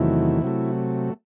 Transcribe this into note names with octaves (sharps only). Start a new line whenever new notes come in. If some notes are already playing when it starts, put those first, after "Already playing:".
Already playing: E2 C3 D#3 F#3 A3 E4
C3 F#3 A3